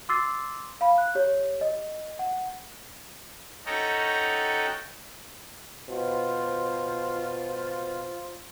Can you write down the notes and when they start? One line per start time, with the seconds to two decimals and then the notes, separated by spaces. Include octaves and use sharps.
0.09 C6 D6 E6 A6 C7
0.81 F5 B5
0.98 F#6
1.15 G4 C#5
1.61 D#5
2.19 F#5
3.66 C#4 D#4 F#4 A4 G5 A#5
5.89 B2 F4 C5